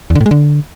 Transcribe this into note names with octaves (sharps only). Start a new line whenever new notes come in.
E2
D3
A2
G#3
D3